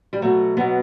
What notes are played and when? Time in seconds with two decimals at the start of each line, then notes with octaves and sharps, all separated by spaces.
0.13 G3
0.22 B2 F#3 A3
0.57 B2 F#3 B3